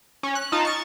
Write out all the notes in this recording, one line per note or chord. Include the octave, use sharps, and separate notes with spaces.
C#4
F#6
D#4 F4 A5
C#6 A6